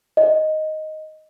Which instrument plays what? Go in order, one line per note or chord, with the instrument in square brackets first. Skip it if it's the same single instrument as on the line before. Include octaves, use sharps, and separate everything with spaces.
[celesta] D#5